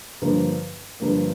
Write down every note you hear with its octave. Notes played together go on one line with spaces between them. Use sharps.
G2 D3 F3 A#3
G2 D3 F3 A#3